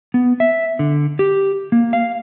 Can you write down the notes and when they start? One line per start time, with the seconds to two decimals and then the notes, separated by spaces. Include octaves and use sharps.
0.14 B3
0.40 E5
0.79 D3
1.19 G4
1.72 A#3
1.93 F5